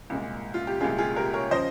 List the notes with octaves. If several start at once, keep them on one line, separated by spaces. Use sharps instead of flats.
C2 A#2 G#3
F4
G4
C2 A#2 G#3 F4 G#4
F4 G#4
G4 A#4
A#4 C#5
C#3 F3 C5 D#5